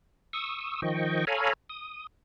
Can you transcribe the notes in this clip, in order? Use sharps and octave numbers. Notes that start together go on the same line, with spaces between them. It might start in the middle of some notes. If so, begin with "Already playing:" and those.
C#6 D#6 E6
D#3 F3 D#5 G5 C#6
A4 C#5 F5 G#5 A#5 B5
D#6